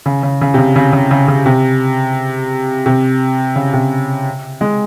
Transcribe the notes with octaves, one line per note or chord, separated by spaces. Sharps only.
C#3
C#3
C#3
C3
C#3
C#3
C#3
C#3
C#3
C3
C3
C#3
C3
G#3